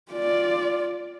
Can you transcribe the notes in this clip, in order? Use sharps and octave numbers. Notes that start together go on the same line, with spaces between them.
F4 D5